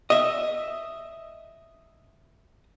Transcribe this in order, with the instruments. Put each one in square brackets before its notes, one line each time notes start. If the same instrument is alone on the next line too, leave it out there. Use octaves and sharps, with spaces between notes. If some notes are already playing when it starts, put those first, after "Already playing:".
[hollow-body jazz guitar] D#5 E5